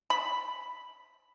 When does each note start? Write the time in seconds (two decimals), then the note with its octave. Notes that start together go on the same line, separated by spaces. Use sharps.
0.10 B5